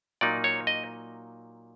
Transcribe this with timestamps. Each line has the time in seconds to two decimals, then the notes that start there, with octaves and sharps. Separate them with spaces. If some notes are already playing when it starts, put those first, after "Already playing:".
0.21 A#2 F#3 A#3 D#4 D5
0.44 C#5
0.67 D#5